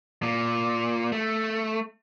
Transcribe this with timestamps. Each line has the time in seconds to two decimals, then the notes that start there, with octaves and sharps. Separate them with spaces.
0.23 A#2
1.12 A3